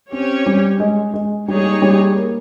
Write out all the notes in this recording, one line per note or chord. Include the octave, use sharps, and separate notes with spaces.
C4 C#4 G4 C#5
G3
G#3
G#3
G3 A#3 D#4 G#4 C#5
G3
A#3